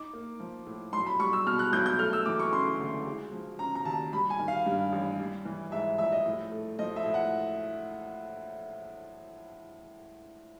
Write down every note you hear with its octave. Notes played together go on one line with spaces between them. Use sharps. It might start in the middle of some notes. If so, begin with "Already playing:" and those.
Already playing: D#4 D6
A#3
F3
A2
B1 C6
B5
G3 C#6
E6
B2 F6
F#6
B1 G6
G6
A3 F6
E6
E3 D6
C#6
C#3 C6
D2
G#3
F3
C#3 A#5
A#5
D#2 A5
G3 B5
G#5
D#3
F5
G2
A1
G3
E3
G#2 E5
A#1 E5
D#5
A2
A3
F3 D#5
E5
A2
F#5